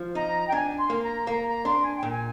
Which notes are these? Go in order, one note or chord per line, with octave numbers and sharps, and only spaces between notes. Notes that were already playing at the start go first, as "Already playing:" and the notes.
Already playing: F3
D#4 A#5
G5
D4 G#5
C6
A#3
A#5
A#3 A#5
A#5
D4 C6
G#5
G5
A#2
G#5